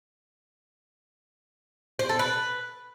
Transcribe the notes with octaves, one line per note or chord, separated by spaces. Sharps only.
C5
A4
B4